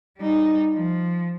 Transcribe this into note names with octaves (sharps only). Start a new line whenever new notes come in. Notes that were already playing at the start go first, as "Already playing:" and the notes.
G3 D#4
F3